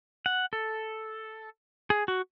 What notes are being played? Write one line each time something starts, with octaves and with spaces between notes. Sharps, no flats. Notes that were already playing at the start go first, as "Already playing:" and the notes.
F#5
A4
G#4
F#4